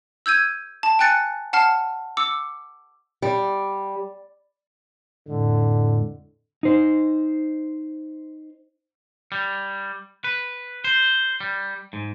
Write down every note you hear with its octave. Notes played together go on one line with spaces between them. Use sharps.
E6 G6 G#6 D#7
A5
G5 G#5 F#6 A6 C#7
F#5 A5 F6 C7
D6 E6 C#7
G3
F2 A2 D3 G#3
D#4 C5
G3
B4
C5
G3
G#2